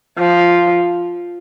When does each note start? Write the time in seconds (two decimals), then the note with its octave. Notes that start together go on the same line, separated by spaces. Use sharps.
0.18 F3